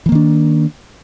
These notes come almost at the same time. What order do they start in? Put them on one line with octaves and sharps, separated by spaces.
E3 A#3 D#3 D4